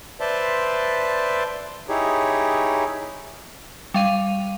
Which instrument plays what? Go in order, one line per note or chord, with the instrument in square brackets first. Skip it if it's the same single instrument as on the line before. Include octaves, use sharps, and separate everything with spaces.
[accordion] B4 C5 D5 E5 A5 C6
D#4 E4 G4 G#4 C#5
[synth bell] G3 F5 D#7